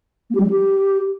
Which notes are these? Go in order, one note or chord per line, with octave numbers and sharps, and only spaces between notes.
A#3
G4
G3
F#3
G4